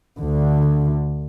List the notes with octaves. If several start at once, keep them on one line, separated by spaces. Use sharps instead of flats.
D2 D3